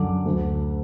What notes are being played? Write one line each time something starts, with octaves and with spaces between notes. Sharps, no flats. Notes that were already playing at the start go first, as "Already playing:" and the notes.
Already playing: F#2 D3 F#3 D6
D2 D3 A3